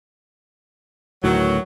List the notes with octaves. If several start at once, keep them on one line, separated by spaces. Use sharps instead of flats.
D2 A2 D#3 E3 F#3